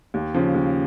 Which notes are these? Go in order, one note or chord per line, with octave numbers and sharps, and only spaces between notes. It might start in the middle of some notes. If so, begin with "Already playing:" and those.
D#2
C#3 F3
D#2